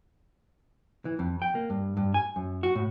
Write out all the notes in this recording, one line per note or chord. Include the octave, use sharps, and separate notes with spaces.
E3
F2
G5
A#3
G2
G2
G#5
F#2
F#4
A2